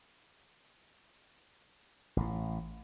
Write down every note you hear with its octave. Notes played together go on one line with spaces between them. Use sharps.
A1 A2